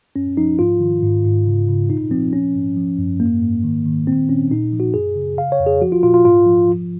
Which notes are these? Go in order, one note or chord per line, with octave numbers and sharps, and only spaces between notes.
F#2 C#4
F3 D#4
G#2 F4
D#3
G#2
G#2
C#3
C#3
A#2 D#4
F3 C4
F3 C#4
G#2
F3
F#2
G#2 A#3
G#2
D#3
D#3
A#2 C4
A#2 C#4
A#2 D#4
F3
F#4
F#2 G#4
C#3
C#3 F5
C#5
F2
G#4
F3 F#4
F4
A#2 F4
F4
G#2 F4
F3
F3